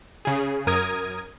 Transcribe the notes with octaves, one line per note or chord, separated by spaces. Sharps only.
C#3 G#4
F#2 A#4 D#6 G#6